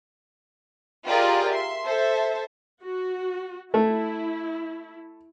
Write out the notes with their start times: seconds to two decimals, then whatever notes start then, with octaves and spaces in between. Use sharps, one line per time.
1.06 F4 G4 G#4 A#4 D5 D#5
1.50 E5 C6
1.85 A4 C5 E5
2.82 F#4
3.74 A3 E4